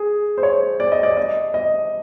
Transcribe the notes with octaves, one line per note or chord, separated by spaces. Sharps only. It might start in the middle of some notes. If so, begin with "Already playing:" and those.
Already playing: G#4
C5
C#5
D5
D#5
D5
D#5
D#5